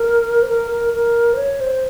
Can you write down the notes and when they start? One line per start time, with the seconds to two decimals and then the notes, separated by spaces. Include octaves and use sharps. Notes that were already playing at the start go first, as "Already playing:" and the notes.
Already playing: A#4
0.43 C5
0.49 A#4
0.71 A#4
0.94 A#4
1.34 C5
1.37 C#5
1.61 C5